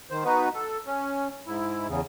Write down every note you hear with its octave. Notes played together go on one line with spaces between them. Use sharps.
D#3 C5
B3 D#4 F#4 B4
A4
C#4
G#2 E4
E2 C#3